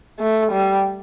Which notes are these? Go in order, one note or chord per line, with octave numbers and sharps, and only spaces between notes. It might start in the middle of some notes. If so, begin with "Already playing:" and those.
A3
G3